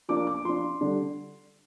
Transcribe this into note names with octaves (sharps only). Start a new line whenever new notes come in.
F3 A#3 D4 D6
D6
F3 D4 C6
D3 G3 D4